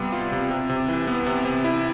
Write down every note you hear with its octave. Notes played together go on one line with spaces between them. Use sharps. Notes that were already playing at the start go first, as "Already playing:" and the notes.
Already playing: C3 G3 B3 F4
F4
C3
C3
C3
E3
B3
C3
C3
E4